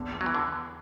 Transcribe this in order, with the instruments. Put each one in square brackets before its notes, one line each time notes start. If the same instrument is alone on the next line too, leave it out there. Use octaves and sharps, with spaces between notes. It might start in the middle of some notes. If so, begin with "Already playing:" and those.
Already playing: [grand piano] E2 [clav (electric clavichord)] D3
[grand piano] E2
[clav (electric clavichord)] F#3
E3
D3